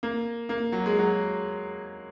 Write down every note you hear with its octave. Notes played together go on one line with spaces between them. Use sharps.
A#3
A#3
F#3
G#3
F#3